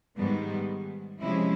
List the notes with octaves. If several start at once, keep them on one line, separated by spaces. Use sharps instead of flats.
G#2 D#3 G3 B3
C3 F3 G#3 C#4 E4